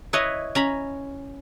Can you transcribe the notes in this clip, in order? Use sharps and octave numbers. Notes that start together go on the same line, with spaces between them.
E4 B4 C#5 D#5
C#4 A#5 B5